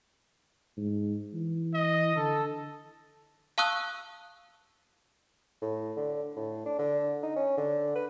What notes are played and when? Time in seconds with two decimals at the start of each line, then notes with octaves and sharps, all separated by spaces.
0.77 G#2
1.34 E3
1.74 D#5
2.17 D3 A4
3.58 F5 A5 C#6 D#6 E6 F#6
5.62 A2
5.97 D3
6.36 A2
6.66 D4
6.79 D3
7.23 D#4
7.36 C#4
7.58 D3
7.96 B4